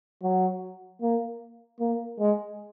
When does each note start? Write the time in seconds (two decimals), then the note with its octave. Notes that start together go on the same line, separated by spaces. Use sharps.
0.22 F#3
1.02 A#3
1.80 A#3
2.19 G#3